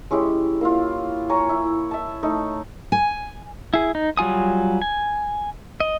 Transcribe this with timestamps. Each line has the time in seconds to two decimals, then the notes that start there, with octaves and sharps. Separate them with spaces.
0.11 G#3 C#4 E4 G4
0.61 A#3 E4 F4
1.29 C#5 G#5 A#5
1.49 E4
1.91 E5 A5
2.23 A3 D#4
2.92 G#5
3.74 E4 G#4
3.95 D#4
4.17 F#3 G3 F4 G#5 D#6
4.82 G#5
5.80 D#5